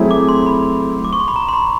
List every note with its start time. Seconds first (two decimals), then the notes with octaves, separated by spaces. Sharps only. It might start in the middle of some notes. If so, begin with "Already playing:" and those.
Already playing: F#3 A3 C4 E4 G#4
0.11 D6
0.29 C6
0.46 B5
1.05 D6
1.13 C#6
1.20 C6
1.28 B5
1.36 A#5
1.49 C6
1.53 B5